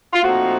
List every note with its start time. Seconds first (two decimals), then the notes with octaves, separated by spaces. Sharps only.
0.14 F4
0.23 A#2 F3 A3 C4 D#4 F#4